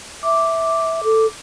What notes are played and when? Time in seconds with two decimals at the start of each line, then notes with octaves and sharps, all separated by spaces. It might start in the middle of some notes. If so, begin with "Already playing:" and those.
0.23 E5 D6
1.03 A4